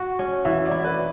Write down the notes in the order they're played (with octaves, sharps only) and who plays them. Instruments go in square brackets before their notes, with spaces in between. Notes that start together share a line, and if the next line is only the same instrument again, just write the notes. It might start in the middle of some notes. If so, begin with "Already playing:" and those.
Already playing: [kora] F#4
C#4
[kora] E3 [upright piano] E5
[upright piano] D5
[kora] E4
[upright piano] B4